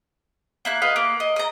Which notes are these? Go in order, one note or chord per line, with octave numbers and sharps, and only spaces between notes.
A#3 E4 F#6
F4 B4 D#5
A#3
D#5
D#5 A#5